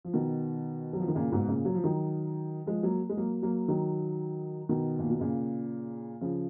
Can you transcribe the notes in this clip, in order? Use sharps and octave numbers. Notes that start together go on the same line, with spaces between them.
F3
B2 D#3
F#3
F3
D#3
A#2 C#3
G#2 B2
A#2 C#3
F#3
F3
D#3 F#3
F3 G#3
F#3 A#3
G#3
F#3 A#3
F#3 A#3
D#3 F#3
B2 D#3
A#2
B2
A#2 C#3
C#3 F3